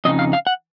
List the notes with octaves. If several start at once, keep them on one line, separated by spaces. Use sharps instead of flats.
F2 C#3 D#4 D#5
F5
F5
F#5